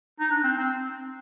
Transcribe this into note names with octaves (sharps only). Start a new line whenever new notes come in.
D#4
D4
C4
C4